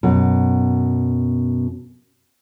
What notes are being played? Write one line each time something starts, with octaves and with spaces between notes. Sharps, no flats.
F#2 B2